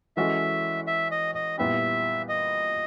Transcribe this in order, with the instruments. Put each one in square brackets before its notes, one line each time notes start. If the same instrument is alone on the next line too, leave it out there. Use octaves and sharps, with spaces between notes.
[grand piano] E3 G#3 C#4 F#4 A4 [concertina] E5
[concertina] E5
D#5
D#5
[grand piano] A#2 G3 B3 E4 G4 [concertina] E5
[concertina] D#5